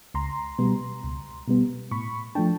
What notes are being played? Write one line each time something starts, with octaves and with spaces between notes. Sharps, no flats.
C#2 A#5 C6
B2 G3 B3
C#2
B2 G3 B3
A2 B5 C#6
F3 A3 D4 G5 A5